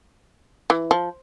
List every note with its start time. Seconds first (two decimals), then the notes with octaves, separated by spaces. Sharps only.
0.70 E3
0.91 F3